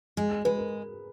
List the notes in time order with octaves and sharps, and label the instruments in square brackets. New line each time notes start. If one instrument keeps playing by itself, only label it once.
[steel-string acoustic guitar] G#3 [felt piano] G#4
[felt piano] G#4
[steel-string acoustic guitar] G#3 [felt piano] B4
[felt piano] A#4